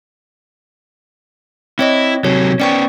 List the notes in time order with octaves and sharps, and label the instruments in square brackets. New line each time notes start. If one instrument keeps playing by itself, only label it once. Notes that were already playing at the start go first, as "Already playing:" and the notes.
[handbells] C4 C#5 D#5 [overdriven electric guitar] E4
[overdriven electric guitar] C3 F#3 [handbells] C#5
[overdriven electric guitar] B3 C#4 [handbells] D5 G5 C#6